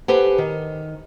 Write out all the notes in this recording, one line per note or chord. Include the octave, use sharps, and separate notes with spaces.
G4 A4 B4 C5 F#5 G#5
D#3